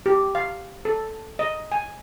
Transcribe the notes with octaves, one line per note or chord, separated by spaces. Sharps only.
G4
F5
A4
D#5
G#5